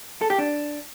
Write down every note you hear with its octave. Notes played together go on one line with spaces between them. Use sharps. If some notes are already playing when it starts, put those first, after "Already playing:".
A4
G4
D4